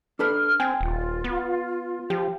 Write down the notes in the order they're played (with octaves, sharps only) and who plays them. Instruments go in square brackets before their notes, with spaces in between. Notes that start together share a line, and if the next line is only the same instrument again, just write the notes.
[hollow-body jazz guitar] D4 A4 B4 [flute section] F6
[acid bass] C4 [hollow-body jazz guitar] G5 G#5
[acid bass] D#1 [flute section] F4
[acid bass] B3
[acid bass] F3 [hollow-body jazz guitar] G4